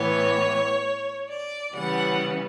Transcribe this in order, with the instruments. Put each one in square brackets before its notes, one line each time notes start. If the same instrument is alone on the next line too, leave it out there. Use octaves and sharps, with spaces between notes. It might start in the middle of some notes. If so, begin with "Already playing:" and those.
Already playing: [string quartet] A2 E3 B3 C#5
D5
C#3 E3 G3 B3 F#5